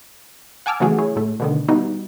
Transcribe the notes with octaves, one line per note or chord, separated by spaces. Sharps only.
F#5 G#5 A5 D6 E6 F6
C#3 E3 F#3 A3 F#4 G#4
E4 G#4 C#5
A2 A3
B2 D3 D#3
G3 B3 D#4 E4 F#4